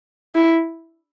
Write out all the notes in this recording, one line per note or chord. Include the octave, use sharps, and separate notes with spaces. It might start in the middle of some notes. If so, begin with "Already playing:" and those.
E4